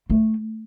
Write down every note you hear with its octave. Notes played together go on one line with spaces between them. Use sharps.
A3